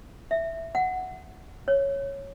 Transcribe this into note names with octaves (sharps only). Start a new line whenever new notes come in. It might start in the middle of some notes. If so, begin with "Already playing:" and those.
E5
F#5
C#5